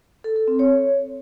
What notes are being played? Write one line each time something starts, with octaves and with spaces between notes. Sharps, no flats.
A4
A4
C4
C#5